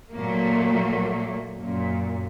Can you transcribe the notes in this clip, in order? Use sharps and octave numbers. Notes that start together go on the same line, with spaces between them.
A#2 F#3 A3 A#3
F#2 A#2